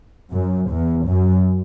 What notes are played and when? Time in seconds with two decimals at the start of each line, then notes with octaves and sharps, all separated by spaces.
0.33 F#2
0.71 E2
1.09 F#2